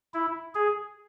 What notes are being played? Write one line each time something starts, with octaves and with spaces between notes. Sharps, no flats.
E4
G#4